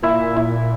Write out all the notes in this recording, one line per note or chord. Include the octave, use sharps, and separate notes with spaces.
A#2 E4
E4